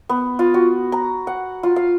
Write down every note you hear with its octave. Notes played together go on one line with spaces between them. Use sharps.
B3
F4
F#4
A#5
F#5
F4
F5